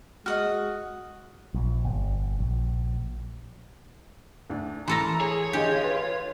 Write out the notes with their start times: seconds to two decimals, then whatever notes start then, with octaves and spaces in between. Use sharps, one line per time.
0.26 G#3 F#4 D#5 D#6 F6
1.54 A#1
1.85 G1
2.39 A#1
4.50 D2 D4
4.88 E3 A4 A#4 A#5 C6 A#6
5.21 G#4 C#5
5.53 D3 F4 G4 G#4 D#5
5.83 B4